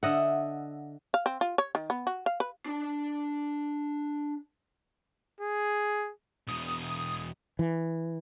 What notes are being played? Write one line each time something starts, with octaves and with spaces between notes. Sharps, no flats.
D3 D#5 E5 F#5
F5
C4
F4
C#5
D#3
B3
F#4
F5
B4
D4 A5
G#4
E2 B2 D#6
E3